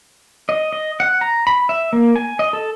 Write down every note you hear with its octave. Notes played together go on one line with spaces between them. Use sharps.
D#5
D#5
F#5
A#5
B5
E5
A#3
G#5
D#5
A4